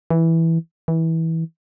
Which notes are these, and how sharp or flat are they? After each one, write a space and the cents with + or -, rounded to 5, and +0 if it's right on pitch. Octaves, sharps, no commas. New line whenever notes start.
E3 -5
E3 -20